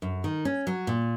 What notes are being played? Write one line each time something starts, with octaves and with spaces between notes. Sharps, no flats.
F#2
D#3
C#4
F#3
A#2